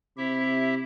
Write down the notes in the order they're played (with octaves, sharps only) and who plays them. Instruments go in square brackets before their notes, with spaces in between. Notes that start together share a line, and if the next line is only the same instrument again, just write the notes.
[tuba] C3 [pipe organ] E4 G4 E5